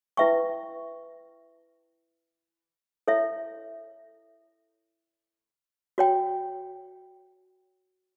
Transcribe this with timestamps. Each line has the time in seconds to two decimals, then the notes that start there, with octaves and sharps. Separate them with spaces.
0.17 E4 B4 E5 G5 C#6
3.08 E4 A4 C#5 E5
5.98 F#4 C#5 G5